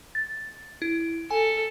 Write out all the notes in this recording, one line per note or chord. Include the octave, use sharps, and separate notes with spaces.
A6
E4
A4 G#5